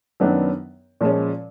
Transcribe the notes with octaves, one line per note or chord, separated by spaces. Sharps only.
F#2 D#3 F#3 B3 D4
A#2 F3 G#3 C#4